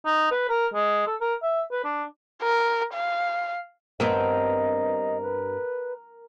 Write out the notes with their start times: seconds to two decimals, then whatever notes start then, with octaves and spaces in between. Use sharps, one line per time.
0.05 D#4
0.31 B4
0.49 A#4
0.74 G#3
1.07 A4
1.21 A#4
1.42 E5
1.72 B4
1.84 D4
2.43 A#4
2.93 F5
4.00 G2 B3 C4 A#4 D#5
5.21 B4